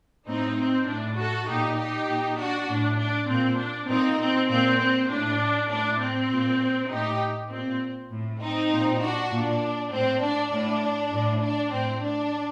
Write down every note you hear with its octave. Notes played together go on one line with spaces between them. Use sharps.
A2 C4 D#4
C4
A2 D4
F#4 A4
A#2 D#4 G4
D#4 G4
A#2
D4 F#4
A2 D4
D4
A#2 C4
D4
A#2 C4 D#4
C4
A#2 C4
C4
A2 D4
A2 D4
C4
A#2
A2 D#4 G4
A#2 C4
A2
C4 D#4
A#2
D4 F#4
A#2 D4
A2 C4
D4
A2 D4
A2
D4
A2 C4
D4